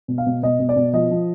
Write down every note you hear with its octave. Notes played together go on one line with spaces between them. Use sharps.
B2
F5
B2
B2 D#5
B2
D5
B2
F3 D#5
F3